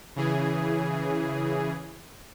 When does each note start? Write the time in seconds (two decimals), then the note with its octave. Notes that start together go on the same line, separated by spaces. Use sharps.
0.16 C#3 E3 G#4